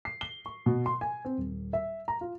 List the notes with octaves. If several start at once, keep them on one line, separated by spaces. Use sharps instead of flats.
C7
G7
C#6
B2
C6
G#5
C4
D#1
E5
A#5
F4